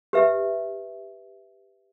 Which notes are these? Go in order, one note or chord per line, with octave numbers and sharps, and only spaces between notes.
G4 B4 E5